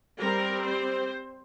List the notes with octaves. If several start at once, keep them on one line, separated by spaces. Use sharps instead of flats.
G3 C4 A#4
C5